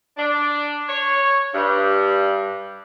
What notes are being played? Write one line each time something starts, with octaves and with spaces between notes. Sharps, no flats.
D4
C#5
G2